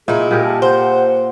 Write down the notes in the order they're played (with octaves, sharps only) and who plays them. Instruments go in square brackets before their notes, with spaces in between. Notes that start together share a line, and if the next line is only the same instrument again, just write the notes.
[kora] A#2 [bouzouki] D#4 E4 [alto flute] G#4
[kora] A#2 G4 A#4
[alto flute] A5
[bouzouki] C5 [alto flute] F#5